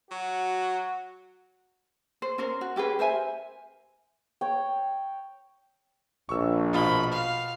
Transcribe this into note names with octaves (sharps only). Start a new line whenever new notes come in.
F#3 F#4
C5
C#4 A#4 C5
F#4
C#4 G4 G#4 B4
A#4 C5 E5 G#5
C#5 G5
A#1 C#6 E6
B2 F4 B5 G7
F5